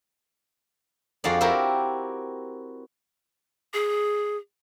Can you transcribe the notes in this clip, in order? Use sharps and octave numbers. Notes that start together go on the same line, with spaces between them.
F2 F4 F#4 G#4 D5
C4 E4 F#4 G4 A#4
G#4